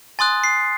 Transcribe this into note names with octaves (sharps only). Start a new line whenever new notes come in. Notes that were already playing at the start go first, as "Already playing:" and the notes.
G#5 C6 D#6 F#6 A6
C7